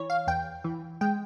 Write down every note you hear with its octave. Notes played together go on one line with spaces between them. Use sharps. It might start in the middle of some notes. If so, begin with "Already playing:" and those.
Already playing: E3 C#5
F5
E2 G5
E3
G#3 G5